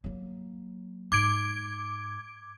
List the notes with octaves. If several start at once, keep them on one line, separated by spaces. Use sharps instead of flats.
F#3 A#3
G#2 D6 G#6 D7